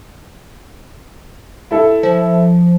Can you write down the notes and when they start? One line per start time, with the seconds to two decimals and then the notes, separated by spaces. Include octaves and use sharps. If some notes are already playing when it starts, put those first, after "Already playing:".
1.71 E4 A4
2.03 F3